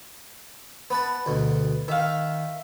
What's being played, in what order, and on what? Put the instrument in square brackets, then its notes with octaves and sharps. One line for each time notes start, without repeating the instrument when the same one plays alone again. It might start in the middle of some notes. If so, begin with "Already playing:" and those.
[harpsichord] B3 B4 A5
D2 B2
[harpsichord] D#3 [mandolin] E5 F5